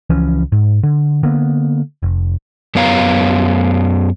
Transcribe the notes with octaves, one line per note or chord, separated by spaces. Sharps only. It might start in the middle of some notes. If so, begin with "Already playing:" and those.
C#2 E3 F3 C#4
G#2
D3
D3 A#3 B3
F1
F#2 B3 C#5 F5 A#5